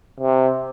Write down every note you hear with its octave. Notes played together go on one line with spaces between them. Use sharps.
C3